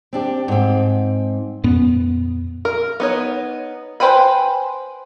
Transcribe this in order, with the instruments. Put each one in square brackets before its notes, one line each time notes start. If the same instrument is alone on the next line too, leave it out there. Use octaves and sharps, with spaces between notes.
[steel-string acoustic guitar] C4 D4 G4
G#2 C4
[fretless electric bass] F2 A#2 B3 C#4
[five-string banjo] A#4
B3 D#4 C#5
B4 C5 G5 G#5 B5